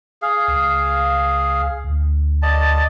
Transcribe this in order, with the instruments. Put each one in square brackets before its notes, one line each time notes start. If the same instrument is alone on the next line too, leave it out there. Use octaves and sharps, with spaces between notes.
[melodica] G#4 F5
[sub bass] C#2
D2
[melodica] D5 D#5 A5